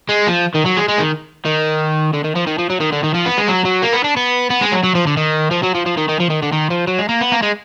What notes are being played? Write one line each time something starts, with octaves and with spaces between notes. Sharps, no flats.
G#3
F3
D#3
F#3
G#3
G#3
D#3
D#3
D3
D#3
F3
D#3
F3
F#3
D#3
D3
D#3
F3
B3
G#3
F#3
F#3
A#3
B3
D4
B3
B3
G#3
F#3
F#3
F3
D3
D#3
F3
F#3
F3
F3
D#3
D#3
F3
D#3
D3
D#3
F3
F#3
G#3
A#3
B3
A#3
G#3